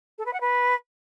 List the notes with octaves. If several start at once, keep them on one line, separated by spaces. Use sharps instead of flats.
A4
B4
F#5
B4